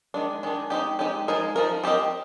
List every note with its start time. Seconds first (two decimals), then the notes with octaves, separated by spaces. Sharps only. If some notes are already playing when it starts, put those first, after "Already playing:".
0.14 D#3 G#3 D4
0.43 D#3 G#3 D4
0.70 G#3 C4 D#4 G4
0.99 G#3 C4 D#4 G4
1.28 F3 G#3 D#4 A#4
1.56 F3 G#3 D#4 A#4
1.84 C4 G4 A#4 D#5